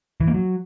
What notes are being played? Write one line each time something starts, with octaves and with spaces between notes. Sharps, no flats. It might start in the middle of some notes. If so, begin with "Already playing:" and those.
E3
A#3
F#3